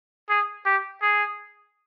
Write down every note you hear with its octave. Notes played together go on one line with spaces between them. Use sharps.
G#4
G4
G#4